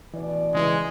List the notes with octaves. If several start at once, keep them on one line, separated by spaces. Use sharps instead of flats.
A1 B2 E3 D5
C#3 E3 G#3